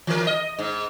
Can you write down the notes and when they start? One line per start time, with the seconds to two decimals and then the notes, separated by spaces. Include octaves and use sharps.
0.07 E3 A#4
0.27 D#5
0.59 G#2